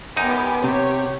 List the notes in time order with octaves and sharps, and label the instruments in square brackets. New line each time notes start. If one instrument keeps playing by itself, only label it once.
[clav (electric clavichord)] F#2 D#4 [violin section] B3 G4 A#4 [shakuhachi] G#5
[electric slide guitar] C3 [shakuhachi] G4 [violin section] C#5